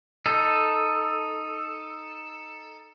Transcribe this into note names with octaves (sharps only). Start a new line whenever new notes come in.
D#4 A4